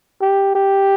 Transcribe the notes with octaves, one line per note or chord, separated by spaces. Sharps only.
G4
G4